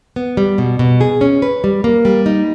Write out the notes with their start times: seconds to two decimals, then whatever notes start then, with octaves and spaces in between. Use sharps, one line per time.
0.16 B3
0.37 G3
0.58 B2
0.79 B2
1.01 G#4
1.21 C#4
1.42 B4
1.64 G3
1.84 A#3
2.05 G3
2.26 D#4